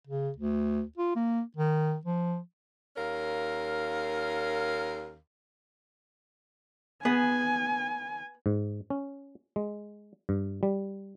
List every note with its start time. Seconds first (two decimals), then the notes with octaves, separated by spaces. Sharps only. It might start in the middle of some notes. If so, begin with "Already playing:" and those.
0.07 C#3
0.37 D2
0.98 F4
1.16 A#3
1.57 D#3
2.06 F3
2.96 D#2 C#4 A#4 F5
7.05 B3 G#4 G#5
8.46 G#2
8.90 C#4
9.56 G#3
10.29 G2
10.63 G3